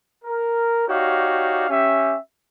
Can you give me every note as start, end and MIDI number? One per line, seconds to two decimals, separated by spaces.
0.25 0.86 70
0.88 1.66 63
0.88 1.66 66
0.88 1.66 67
0.88 1.66 73
0.88 1.66 74
0.88 1.66 77
1.69 2.17 61
1.69 2.17 67
1.69 2.17 76